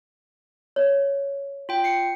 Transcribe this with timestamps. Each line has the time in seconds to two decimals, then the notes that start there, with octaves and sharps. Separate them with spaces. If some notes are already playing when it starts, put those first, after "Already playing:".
0.76 C#5
1.69 F4 G5
1.84 C7 C#7